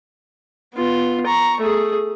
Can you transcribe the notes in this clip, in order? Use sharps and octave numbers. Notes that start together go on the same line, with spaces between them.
B3 F4
A#5 C#6
A3 G#4